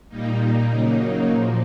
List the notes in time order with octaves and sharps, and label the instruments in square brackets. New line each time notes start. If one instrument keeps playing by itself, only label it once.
[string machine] A#2 G3 A#3 D#4
C#3 F#3 A#3 D#4
A#2 F3 A#3